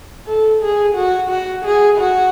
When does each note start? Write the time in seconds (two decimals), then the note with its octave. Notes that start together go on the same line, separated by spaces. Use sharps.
0.27 A4
0.62 G#4
0.95 F#4
1.30 F#4
1.65 G#4
1.98 F#4